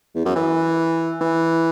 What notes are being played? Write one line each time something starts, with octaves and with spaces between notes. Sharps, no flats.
E2
F#2
E3
E3